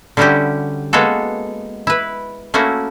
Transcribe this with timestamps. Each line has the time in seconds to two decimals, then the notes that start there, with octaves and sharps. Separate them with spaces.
0.17 D3 G3 C#4 E4 F#4 G4
0.93 G#3 A#3 B3 F#4 G#4 A4
1.87 E4 B4
2.54 A3 A#3 C#4 E4 F#4